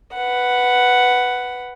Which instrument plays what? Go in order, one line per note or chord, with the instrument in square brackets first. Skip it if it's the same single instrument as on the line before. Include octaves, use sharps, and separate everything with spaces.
[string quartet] B4 F#5